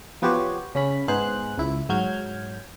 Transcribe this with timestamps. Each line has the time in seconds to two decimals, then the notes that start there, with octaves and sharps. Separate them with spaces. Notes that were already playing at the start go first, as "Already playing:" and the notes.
0.22 F3 B3 F#4 G4 C5 C#5
0.75 C#3 C#4 B5
1.08 G#2 B3 D#4 G#4 C5 F#6
1.58 C#2 E4
1.89 G#2 F#3 F6 G6 G#6